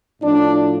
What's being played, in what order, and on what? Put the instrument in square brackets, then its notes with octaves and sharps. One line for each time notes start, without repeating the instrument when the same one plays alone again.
[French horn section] A2 F3 D4